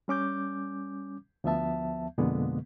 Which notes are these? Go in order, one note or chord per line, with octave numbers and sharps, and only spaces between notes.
G3 C#4 D6 G6
D2 F3 B3 E5 A5
F2 B2 D3 G#3 A#3 B3